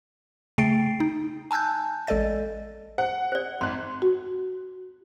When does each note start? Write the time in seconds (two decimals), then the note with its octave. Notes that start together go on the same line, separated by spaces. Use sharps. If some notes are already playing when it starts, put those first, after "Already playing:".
0.58 C#3 A3 G5 A6 C7 D7
1.00 D#4
1.51 G#5 A5 E6 F#6 G6
2.07 A1 G#3 A4 D5 D#5 A6
2.98 C5 F#5
3.32 C5 D5
3.61 G#1 C6 F#6
4.02 F#4